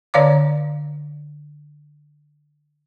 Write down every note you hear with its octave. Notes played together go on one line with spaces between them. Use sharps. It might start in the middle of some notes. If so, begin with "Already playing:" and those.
D3 C#5 D5 F5 A#5 D6